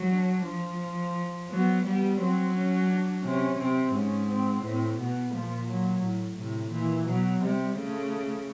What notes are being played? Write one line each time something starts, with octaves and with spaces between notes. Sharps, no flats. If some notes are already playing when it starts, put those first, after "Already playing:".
Already playing: F#3
D4
F3
F#3 B3
G3 B3
F#3 C4
C#4
D4
C3 C#4
C3 C4
G#2 C#4
C4
A2 C4
B2 B3
A#2 F3
F#3
A2
A2 C3
A#2 E3
B2 F#3
C3 G3
C#3 A3